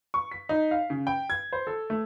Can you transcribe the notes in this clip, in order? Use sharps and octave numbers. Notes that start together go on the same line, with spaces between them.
C#6
B6
D#4
F5
C#3
G5
G#6
C5
A4
A3